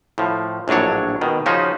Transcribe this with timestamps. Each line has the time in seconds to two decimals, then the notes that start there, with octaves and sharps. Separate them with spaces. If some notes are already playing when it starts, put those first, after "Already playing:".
0.18 A2 F3
0.68 A#1 A2 F#3 D4 C#5
1.21 B2 D#3
1.46 C#3 F3 C#4 D#4 F#4 C5